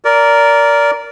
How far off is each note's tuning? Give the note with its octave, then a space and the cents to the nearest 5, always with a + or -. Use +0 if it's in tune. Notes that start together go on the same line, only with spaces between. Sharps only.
A#4 +0 D5 -20